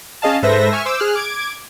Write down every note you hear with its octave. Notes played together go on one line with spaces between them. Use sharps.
C#4 G#4 D#5 F5 A5
G#2 A4 B4 C5 E5 A#6
E5 G#5 C#6 F6
C5 D6 E6
G#4 F6 F#6
D6 G#6 D7